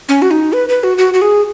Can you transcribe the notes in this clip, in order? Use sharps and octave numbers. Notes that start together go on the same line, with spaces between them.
C#4
F#4
D#4
B4
B4
F#4
F#4
F#4
G#4